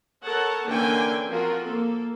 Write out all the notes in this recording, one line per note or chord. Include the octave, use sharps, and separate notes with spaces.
A4 A#4 C#5 F#5 A5
D3 E3 A#3 C#4 G5 G#5
F3 C4 F4 F#4 A#4
A#3 A4